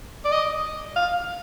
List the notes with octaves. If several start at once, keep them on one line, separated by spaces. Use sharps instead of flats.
D5
D#5
F5